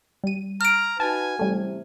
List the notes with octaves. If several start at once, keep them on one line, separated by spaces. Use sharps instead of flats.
G3 D#7
A#5 F6 D7
D#4 F#4 B4 G#5 A5
A1 C3 G3 A3